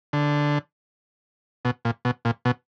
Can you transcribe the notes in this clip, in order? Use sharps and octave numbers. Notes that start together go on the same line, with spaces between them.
D3
B2
A#2
B2
A#2
B2